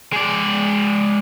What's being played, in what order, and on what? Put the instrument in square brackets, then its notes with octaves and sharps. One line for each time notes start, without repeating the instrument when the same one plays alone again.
[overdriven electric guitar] G#3 D5